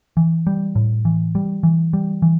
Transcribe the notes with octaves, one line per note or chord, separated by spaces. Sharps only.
E3
G3
A2
E3
G3
E3
G3
E3